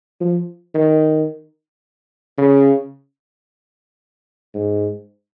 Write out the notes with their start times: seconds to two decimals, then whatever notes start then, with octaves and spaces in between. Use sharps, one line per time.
0.21 F3
0.75 D#3
2.38 C#3
4.55 G#2